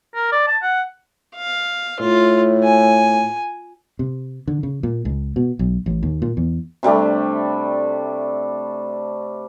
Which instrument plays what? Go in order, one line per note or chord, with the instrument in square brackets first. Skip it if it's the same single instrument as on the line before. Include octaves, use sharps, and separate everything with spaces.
[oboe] A#4
D5
A5
F#5
[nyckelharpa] F5
[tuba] A2 [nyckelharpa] F4
[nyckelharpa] G#5
[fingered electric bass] C3
D3
C#3
A#2
C#2
B2
B1
A1
D#2
A#2
E2
[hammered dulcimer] C3 G3 A3 D4